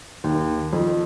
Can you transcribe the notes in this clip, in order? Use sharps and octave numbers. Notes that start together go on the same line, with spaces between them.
D#2
F2